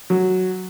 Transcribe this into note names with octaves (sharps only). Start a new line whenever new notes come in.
F#3